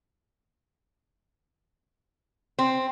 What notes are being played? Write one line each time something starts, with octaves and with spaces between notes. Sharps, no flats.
C4